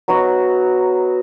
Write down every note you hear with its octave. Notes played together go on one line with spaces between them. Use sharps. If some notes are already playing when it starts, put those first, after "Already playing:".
F#3 B3 D#4 F#4